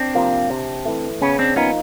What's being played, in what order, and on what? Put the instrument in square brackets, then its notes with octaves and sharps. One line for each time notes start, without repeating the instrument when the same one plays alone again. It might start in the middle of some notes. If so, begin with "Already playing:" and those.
Already playing: [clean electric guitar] C4 D4
[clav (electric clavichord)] C3 F3 A#3
C3
E3 A3
[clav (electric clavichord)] C#3 [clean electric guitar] B3 C#4
[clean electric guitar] C4 D4
[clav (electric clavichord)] F3 A#3 D#4 [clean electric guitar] B3 C#4